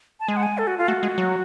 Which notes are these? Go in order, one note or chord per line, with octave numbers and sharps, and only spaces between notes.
A5
G#3 G#5
F#5
G#5
A4
F#4
F4
A3 F#4
G#3
F#3